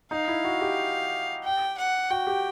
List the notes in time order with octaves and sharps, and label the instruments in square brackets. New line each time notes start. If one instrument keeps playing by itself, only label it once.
[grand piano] D#4 [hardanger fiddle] F5
[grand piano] E4
F#4
G4
[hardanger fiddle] G5
F#5
[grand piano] F#4 [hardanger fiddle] G5
[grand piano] G4